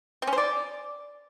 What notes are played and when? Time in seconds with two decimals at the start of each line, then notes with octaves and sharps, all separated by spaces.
0.22 C4
0.27 C#4
0.33 C5
0.38 D5